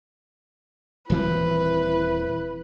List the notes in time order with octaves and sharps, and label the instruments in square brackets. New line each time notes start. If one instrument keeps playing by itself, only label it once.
[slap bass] D#1 E3 C4 [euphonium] E4 [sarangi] B4